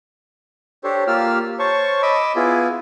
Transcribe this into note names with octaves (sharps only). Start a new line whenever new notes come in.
D4 G4 A4 C5 C#5
A#3 F4 G4 F5 E6 F6
C5 C#5 A5 C#6
D#5 B5 D6 E6
B3 E4 F4 G#4